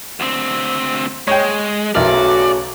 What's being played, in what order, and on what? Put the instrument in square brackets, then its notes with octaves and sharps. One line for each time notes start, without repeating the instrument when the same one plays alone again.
[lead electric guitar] D2 C4
[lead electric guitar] G#3 [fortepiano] C#5 G5
[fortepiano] B1 E4 A#4 [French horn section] C#3 A3 F#4 [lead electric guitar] D5